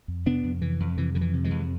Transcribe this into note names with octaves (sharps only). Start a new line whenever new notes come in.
F2
C3 B3 D4
F2
C3 E3
F2
C3 E3
F2 D3
E3
C3
E3 G#3
F2